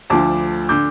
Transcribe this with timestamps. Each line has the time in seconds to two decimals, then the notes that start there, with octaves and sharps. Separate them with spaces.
0.10 D2 D3 F3 A5 D6
0.69 D3 D6 G6